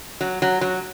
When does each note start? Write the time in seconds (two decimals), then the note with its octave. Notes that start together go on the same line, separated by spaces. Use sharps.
0.21 F#3
0.42 F#3
0.61 F#3